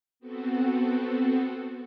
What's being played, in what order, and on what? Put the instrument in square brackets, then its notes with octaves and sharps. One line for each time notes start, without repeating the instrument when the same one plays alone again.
[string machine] B3 C4 F#4 A4